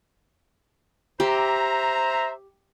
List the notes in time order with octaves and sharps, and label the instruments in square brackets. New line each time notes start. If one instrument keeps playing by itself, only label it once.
[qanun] G4 [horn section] C5 E5 A#5